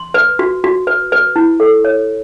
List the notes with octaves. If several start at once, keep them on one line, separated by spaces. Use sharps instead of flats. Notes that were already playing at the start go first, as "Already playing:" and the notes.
Already playing: C6
B4
F#4
F#4
B4
B4
E4
A4
C#5